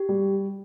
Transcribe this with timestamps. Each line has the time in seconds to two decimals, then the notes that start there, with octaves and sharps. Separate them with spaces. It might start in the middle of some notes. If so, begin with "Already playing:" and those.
Already playing: G4
0.09 G3